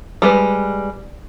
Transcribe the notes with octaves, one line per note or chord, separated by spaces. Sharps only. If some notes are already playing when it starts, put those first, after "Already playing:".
G3 G#3 B4